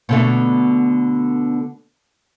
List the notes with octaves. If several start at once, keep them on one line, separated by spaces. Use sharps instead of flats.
B2 D3 A3